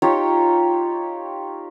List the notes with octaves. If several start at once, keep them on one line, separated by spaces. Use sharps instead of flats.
D#4 F4 G4 C#5